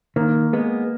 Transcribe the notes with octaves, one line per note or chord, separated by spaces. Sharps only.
D#3 A#3
G#3 B3